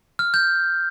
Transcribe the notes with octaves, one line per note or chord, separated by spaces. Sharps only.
F6
G6